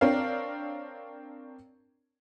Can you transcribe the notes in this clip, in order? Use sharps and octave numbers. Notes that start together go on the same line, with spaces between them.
C4 D4 A#4 C#5 F5